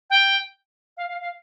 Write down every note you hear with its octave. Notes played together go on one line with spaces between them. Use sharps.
G5
F5
F5
F5